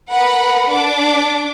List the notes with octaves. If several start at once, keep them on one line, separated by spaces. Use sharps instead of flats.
A#4 B4 F#5 B5
D4 D6